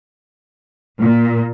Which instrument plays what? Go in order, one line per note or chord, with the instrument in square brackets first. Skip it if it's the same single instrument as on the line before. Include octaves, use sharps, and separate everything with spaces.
[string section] A#2